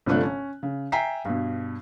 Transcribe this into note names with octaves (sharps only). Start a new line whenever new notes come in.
G1 C3 F3 A3 D4 F#6
C#4
C#3
E5 G5 G#5 A#5 B6 C7
G2 B2